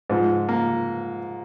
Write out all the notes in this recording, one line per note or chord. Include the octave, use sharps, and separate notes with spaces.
G#2 F3
A#3